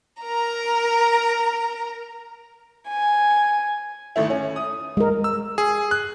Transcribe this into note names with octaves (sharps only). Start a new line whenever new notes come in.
A#4 A#5
G#5
G#1 A3 E4
C#4
D#6
G#3 A#4
E6
G#4
F#6